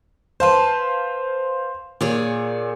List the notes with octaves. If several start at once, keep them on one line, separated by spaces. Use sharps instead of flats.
B4 C5 F5 A5 C6
A#2 G#4 C#5 D5